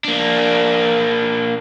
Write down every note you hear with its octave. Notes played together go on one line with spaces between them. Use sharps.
A#3 D4